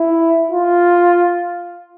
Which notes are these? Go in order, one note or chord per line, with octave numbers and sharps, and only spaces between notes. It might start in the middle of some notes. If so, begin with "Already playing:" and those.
Already playing: E4
F4